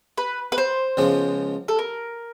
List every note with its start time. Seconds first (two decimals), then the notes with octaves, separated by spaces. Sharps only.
0.18 B4
0.52 B4
0.58 C5
0.97 C#2 C#3 F3 G#3 B3
1.68 A4
1.79 A#4